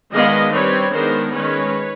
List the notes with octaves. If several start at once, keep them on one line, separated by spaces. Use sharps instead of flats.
D#3 G#3 B3 D4 D#5 F5
G3 C4 B4 C#5
D#3 G#3 B3 D4 A#4 C5
D#3 G#3 C#4 B4 C#5